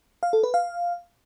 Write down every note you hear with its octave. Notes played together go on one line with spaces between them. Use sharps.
F5
A4
B4
F5